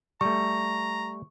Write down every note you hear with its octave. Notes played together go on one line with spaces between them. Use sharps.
G3 A3 A#5 C#6